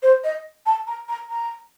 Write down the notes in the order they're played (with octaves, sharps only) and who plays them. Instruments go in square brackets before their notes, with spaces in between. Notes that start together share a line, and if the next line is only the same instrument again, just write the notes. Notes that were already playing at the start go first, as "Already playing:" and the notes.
[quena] C5
D#5
A5
A#5
A#5
A#5